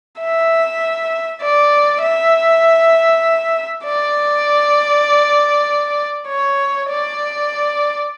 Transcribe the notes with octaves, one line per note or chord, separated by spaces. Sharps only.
E5
D5
E5
D5
C#5
D5